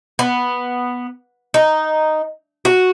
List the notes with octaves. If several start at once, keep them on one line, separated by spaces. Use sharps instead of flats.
B3
D#4
F#4